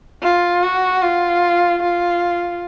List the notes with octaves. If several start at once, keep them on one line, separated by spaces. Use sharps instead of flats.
F4
F#4
F4
F4